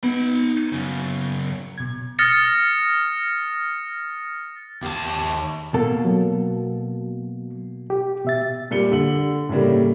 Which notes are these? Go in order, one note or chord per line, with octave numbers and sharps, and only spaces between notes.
B3 D#4 B5
F#2 C#3
B2 G#6
D#6 F6 A6 A#6 C#7
D#2 A5
B2 A#3 A4
F#3
G4
B2 E5 A6
A#2 G3 C#7 G7
D3 F#7
A2 C#3 G3 A#3